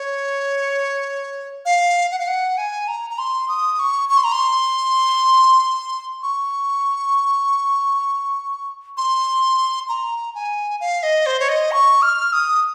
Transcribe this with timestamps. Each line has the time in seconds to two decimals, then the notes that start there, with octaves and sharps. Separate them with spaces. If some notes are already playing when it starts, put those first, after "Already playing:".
Already playing: C#5
1.65 F5
2.12 F#5
2.19 F5
2.27 F#5
2.58 G#5
2.88 A#5
3.10 A#5
3.18 C6
3.48 D#6
3.79 C#6
4.09 C#6
4.17 C6
4.24 A#5
4.32 C6
6.23 C#6
8.97 C6
9.89 A#5
10.35 G#5
10.80 F5
11.03 D#5
11.26 C5
11.40 C#5
11.49 D#5
11.72 C#6
12.02 F6
12.33 D#6